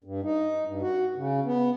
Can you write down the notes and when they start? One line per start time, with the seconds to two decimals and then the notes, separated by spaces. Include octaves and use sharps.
0.04 G2
0.23 D#4
0.65 G2
0.82 F#4
1.16 C#3
1.45 B3